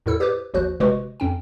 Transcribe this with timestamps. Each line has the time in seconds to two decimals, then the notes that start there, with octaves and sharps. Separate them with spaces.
0.06 E2 A2 E4 A4 E6
0.20 G4 B4 C5 D6 F#6
0.54 G#1 D#2 F3 F#4 C5 F#6
0.80 G1 C3 G#3 F#4 B4 C#6
1.20 F2 C#4 G5